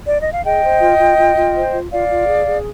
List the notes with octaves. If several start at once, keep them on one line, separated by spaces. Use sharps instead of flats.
D5
D#5
F5
G#4 D#5 G5
C5
F4
F4
F4
F4
C5
F4
F4 D5 F5
F4
G#4
G#4